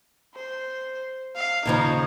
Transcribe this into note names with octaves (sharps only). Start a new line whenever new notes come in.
C5
F5
D#2 C#3 F3 D#4